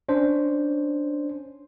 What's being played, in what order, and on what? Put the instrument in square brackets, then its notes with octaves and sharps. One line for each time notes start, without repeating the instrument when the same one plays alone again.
[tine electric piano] C#4 D4 C5